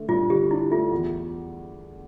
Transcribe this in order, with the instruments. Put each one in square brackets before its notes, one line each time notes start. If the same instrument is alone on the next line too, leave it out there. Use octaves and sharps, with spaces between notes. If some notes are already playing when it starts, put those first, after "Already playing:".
Already playing: [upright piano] D3 A3 D4
[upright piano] G2 [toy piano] F4
[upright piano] D3 [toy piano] G4
[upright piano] D4 [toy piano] E4
[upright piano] A3 [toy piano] F4
[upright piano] E2